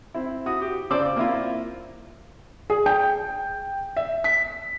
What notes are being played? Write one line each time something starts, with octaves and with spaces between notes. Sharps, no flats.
C4 E4
E4 F#4 D#6
G4
C#3 F4 C5 D5 D6 E6
A#3 C4 E4 F4
G#4
G5
E5
B6